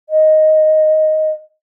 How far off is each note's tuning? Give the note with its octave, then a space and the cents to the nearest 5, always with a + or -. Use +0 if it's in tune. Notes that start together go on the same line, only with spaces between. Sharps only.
D#5 +0